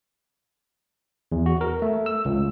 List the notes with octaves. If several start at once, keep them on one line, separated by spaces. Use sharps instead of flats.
E2
F#4
A#4
A3
E6
C#2